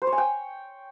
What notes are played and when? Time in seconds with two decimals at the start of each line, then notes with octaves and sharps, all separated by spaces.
0.02 C5
0.07 C#5
0.12 G#5
0.18 G5